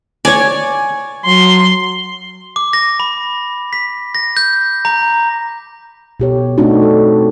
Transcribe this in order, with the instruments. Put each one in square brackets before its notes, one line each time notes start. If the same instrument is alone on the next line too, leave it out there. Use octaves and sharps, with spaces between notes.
[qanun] C#5 D5 [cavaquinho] G#5
[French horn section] F#3 [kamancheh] C6
[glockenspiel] D6
A#6
B5
B6
A#6
G6
A#5
[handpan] B2 G4 C#5
A3 C4 D4 D#4 F#4
A4